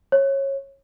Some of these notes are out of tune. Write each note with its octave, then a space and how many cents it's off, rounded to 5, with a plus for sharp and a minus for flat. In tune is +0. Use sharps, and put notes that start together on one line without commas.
C#5 -20